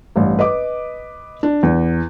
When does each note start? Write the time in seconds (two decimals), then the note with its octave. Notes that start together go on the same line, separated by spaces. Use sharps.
0.16 A1 G2
0.39 B4 D#5 D6
1.43 D4
1.63 E2